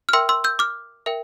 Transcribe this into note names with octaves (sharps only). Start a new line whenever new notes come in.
F6
A#4 E5 G5 C6 E6
C6 E6
E6 G6
D6 F6
A#4 E5 G5